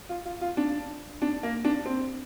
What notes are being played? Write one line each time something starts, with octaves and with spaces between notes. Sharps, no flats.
F4
F4
F4
D4
D4
A#3
D4
C4